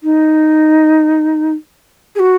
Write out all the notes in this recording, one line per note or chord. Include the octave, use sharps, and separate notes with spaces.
D#4
G#4
F#4